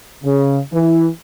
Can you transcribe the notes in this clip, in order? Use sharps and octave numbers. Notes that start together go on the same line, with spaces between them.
C#3
E3